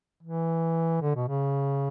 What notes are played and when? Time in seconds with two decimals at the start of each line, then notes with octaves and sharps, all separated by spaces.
0.23 E3
1.02 D3
1.15 B2
1.28 C#3